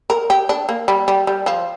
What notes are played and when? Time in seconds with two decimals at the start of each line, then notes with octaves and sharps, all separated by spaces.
0.10 A#4
0.30 G4
0.49 D4
0.69 A#3
0.88 G3
1.08 G3
1.27 G3
1.46 F3